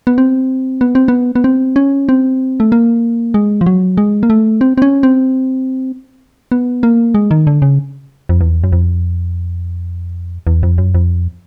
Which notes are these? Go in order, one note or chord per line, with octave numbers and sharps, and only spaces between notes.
B3
C4
B3
C4
B3
B3
C4
C#4
C4
A3
A#3
G#3
F3
F#3
G#3
A#3
A3
C4
C4
C#4
C4
B3
A#3
G#3
D#3
D3
C#3
F2
E2
F#2
F2
E2
F2
F#2
F2